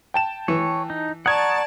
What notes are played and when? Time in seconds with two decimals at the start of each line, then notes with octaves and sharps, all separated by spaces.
0.14 G5 A5 E7
0.48 E3 C#5
0.90 D#4
1.26 D5 F#5 A5 A#5 C#6 D#6 G#6